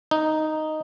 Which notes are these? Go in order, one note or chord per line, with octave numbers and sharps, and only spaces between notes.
D#4